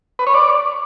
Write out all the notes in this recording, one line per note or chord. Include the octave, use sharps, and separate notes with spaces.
B4
C#5
D5